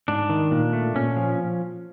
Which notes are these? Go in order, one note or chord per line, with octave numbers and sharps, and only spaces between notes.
G#2 D4
D#3
A#2
A3
A#2 C#4
F3